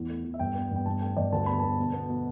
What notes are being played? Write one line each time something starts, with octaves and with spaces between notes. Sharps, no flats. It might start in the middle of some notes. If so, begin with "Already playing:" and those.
Already playing: E2 A2
A3
E2
E5
G2 G5
B3
G2 G5
G2 A5
A3 G5
G2 D5
D2 A5
B3 B5
D2 A5
B2
B3
B2